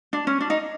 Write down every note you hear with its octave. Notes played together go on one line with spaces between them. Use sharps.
D4
C#4
D4
D#4